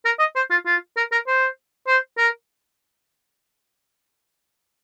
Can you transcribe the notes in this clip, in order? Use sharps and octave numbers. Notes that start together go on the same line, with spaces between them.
A#4
D#5
C5
F4
F4
A#4
A#4
C5
C5
A#4